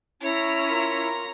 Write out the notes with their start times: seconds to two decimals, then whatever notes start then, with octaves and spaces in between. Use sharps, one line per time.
0.21 C#4 E4 C#5 A#5
0.70 F4 A#4